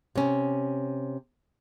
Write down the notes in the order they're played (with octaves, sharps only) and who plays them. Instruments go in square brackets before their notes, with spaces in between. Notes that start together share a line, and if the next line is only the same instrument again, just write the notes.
[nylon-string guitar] C3 C#4